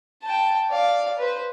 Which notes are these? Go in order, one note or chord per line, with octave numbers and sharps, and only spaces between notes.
G5 A5
D5 F5
B4 C5